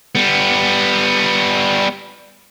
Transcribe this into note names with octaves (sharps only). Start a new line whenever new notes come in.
G3 B3